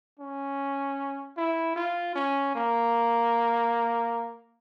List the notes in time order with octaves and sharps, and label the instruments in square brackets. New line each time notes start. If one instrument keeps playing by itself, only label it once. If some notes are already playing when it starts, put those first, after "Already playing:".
[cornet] C#4
E4
F4
C#4
A#3